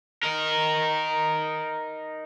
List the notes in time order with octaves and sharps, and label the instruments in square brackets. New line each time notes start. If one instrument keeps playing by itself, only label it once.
[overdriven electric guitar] D#4 A#4